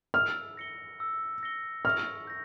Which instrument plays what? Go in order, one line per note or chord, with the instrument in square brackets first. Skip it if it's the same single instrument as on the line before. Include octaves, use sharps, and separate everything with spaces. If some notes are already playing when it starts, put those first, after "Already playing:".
[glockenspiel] E6 [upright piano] F6
[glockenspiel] A#6 C#7 G7
E6
A#6 C#7 G7
[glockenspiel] C#6 [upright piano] F6
[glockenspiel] G6 A#6